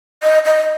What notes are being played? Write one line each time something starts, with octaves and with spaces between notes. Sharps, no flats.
D#5
D#5